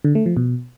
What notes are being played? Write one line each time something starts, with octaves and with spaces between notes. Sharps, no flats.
D3
A3
F3
B2